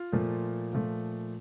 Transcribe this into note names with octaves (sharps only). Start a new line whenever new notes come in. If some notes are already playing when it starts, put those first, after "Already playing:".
Already playing: F4
A#2 F3 A3
A#2 F3 A3